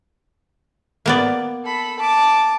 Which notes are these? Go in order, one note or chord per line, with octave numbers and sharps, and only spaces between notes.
A#3 B3 D5
A4 B5
A5 D6